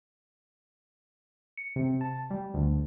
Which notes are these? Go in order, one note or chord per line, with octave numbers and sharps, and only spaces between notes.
C#7
C3
A5
G3
D2